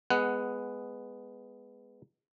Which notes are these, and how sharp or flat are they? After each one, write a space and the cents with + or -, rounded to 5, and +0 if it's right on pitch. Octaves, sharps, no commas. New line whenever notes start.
G#3 +0 B3 +10 F#5 +0